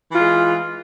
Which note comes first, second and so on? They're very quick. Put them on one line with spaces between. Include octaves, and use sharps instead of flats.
E3 F4 G#3